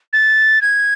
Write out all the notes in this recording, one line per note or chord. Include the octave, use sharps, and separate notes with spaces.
A6
G#6